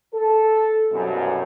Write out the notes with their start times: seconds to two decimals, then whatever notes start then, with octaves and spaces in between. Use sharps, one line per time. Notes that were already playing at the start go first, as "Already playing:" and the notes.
0.14 A4
0.92 C2 F#2 B2